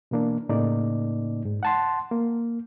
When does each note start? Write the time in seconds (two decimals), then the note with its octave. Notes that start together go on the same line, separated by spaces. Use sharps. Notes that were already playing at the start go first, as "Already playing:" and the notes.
0.11 B2 E3 A#3 D4
0.49 A2 C#3 A#3 D#4 D5
1.45 G#2
1.63 F#5 A5 C6
2.11 A#3